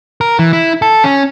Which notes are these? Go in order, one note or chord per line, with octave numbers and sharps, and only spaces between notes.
A#4
E3
E4
A4
C#4